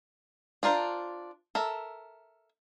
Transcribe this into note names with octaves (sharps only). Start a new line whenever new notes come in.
D4 F4 A#4 C5
A4 A#4 E5